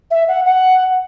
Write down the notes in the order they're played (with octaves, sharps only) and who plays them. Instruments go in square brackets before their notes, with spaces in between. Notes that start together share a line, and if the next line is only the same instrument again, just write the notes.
[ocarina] E5
F#5
F#5